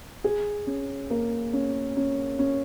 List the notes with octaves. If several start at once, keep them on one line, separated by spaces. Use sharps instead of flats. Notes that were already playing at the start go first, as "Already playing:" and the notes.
G#4
C#4
A#3
C#4
C#4
C#4